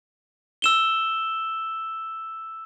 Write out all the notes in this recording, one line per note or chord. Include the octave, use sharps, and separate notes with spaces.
E6 E7 G7